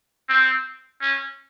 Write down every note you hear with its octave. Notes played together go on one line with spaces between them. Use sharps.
C4
C#4